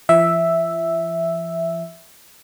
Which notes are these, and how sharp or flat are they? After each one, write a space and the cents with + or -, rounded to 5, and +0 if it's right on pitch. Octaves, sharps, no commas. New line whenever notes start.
F3 -45 E5 +0